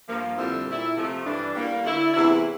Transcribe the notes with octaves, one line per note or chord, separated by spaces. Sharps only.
G2 F3 A#3
F2 D3 G3 C4 E4
A#2 A3 E4
C3 F3 A3
G2 E3 G3 D4
A2 G3 A#3
D3 A3 E4
E2 C3 E3 A3 E4